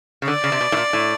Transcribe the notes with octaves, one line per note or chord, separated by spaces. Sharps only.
C#3
D3 D5
C#3
C3
B2
A2
A#2
A2